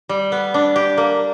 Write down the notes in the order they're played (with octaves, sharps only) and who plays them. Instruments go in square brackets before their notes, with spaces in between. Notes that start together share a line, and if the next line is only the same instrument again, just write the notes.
[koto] G3
B3
D4
G4
A#3